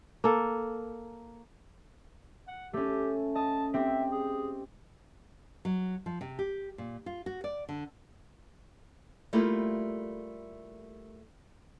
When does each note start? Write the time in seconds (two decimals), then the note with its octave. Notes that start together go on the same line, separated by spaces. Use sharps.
0.24 A#3 A4
2.48 F#5
2.73 A3 C#4 G4
3.35 D#5 A5
3.74 C4 G4 E5
4.12 G#4
5.65 F#3
6.06 F3
6.21 C3
6.39 G4
6.78 A#2
7.06 F4
7.26 F#4
7.44 D5
7.69 D3
9.33 G3 A3 A#3 E4 F4 G4